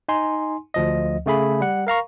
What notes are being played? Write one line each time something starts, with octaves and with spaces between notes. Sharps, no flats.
D#4 G#5 C6
D2 F3 D#5
C#3 A3 G#4 B5
G3 F#5
A#4 F5 A#5 C#6